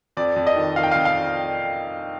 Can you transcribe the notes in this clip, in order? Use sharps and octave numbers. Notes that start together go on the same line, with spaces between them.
F2 D5
F2
D#5
D#3
D#3 F5
G5
F2 F5
F5